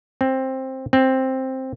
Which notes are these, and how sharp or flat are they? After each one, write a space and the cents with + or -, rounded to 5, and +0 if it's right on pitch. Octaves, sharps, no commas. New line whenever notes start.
C4 +10
C4 +5